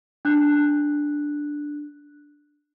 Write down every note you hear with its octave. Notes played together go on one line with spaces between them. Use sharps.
D4 F#6